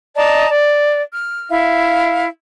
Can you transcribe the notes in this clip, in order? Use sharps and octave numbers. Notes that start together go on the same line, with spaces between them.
D5 D#5 A5 A#5
D5
F6
E4 E5 F5